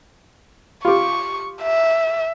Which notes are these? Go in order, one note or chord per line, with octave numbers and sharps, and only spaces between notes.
F4 G4 C#6
E5